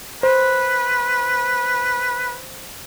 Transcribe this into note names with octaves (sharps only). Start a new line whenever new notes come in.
B4 C5